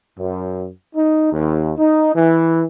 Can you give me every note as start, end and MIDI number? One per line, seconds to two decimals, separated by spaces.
0.19 0.66 42
0.95 1.29 63
1.33 1.72 39
1.77 2.12 63
2.14 2.63 52